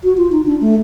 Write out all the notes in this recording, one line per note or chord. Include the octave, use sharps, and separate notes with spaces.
F#4
F4
D#4
D4
A3